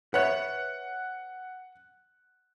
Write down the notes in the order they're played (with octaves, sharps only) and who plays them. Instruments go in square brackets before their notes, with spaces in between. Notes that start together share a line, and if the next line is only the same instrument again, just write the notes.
[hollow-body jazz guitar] B4 C#5 E5 [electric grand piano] F#5 F#6